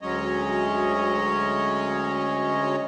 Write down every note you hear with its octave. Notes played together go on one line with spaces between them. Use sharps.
D2 F#3 G#3 C#4 C#5 D#5